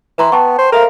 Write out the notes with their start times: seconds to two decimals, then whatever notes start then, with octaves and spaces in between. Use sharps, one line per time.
0.18 E3 B4 A#5 C6
0.32 B3 G5 A5 C#6
0.58 C5
0.72 A4 A#4 E5 F5